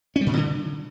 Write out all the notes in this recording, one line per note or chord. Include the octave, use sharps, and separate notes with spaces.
C#4
G3
A#2
C3
D3